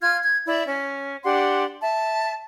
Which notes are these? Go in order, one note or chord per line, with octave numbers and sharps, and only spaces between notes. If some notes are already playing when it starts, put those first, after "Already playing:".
F4 F6 G#6
G#6
E4 D5 E5
C#4
D4 G4 F#5 C6
E5 A5